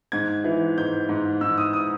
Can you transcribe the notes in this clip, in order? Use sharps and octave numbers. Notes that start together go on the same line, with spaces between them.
G#2 G#6
E3
G#2 G6
G#2
G#2 E6
D#6
D#6